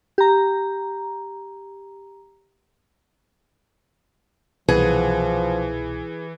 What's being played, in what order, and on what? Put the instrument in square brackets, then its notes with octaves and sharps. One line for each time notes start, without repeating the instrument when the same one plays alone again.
[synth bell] G4 A#5
[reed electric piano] C2 B2 B4 [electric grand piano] E3 [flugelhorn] F3 [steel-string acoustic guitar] G#4 F#5